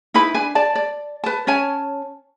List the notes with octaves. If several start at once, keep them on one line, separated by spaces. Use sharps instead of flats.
D#4 E4 B4 B5
D4 B4 G#5
D5 A5
D5
B4 A5
C#4 C#5 G#5 A5